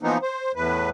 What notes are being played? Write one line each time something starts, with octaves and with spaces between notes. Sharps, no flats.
E3 F3 A#3 B3 D#4
C5
E2 A2 B4